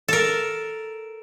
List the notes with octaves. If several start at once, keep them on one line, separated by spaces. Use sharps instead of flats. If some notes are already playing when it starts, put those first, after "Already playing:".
A4 A#4